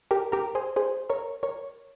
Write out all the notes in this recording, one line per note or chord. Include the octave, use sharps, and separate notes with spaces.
G4 A#4
G4 A#4
G#4 C5
G#4 C5
A#4 C#5
A#4 C#5